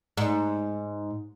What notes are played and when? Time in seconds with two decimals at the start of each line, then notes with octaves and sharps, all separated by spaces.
0.17 G#2